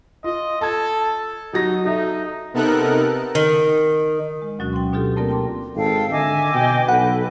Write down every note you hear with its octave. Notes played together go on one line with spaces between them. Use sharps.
F4 D#5
A4 A5 G#6
F#3 D#4 F#4 A#6
D#4 A4 E5
C3 B3 D#4 A4 A#4 F#6
D#3
G#3
D2 B2 F#3 C#4 F#4 F#5
G5 C6
B2 D4 F4 G4 A4
A3 A#3 C4 F4 A#4 D5
F4 G5 A5 C6 D6
G#1 A4 F5 G5
D3 D#5 E5 G#5 D6
B2 G5
B1 A4 B4 F#5